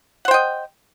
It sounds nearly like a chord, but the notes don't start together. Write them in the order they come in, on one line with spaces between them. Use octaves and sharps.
F#5 C5 G5 D#5